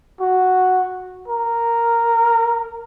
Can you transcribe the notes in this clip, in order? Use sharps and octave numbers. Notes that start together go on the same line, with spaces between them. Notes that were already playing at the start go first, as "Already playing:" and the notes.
F#4
A#4